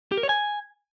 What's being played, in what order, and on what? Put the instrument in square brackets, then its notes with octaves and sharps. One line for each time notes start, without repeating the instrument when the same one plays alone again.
[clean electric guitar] G4
A#4
C#5
G#5